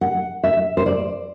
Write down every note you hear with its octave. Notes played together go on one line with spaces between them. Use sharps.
F#5
E5
C5
D5